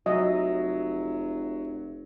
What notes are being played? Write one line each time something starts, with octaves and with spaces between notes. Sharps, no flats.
F1 F#3 D#5 E5